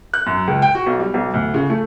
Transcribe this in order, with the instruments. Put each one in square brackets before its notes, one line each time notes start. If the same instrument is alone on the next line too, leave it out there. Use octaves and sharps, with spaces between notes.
[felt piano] F#6
F#2
C#2
G5
F#4
B1
G3
B1
D2
C#3
A3